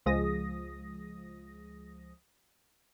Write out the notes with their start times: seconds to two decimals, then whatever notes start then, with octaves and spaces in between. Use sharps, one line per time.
0.06 C#2 F3 G#3 D#6 A#6